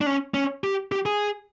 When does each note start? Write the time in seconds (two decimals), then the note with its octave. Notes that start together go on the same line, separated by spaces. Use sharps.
0.01 D4
0.06 C#4
0.34 C#4
0.64 G4
0.92 G4
1.06 G#4